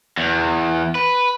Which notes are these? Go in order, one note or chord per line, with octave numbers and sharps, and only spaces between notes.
E2
B4